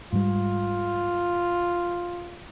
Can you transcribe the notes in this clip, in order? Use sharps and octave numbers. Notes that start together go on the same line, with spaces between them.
G#2 G3 F4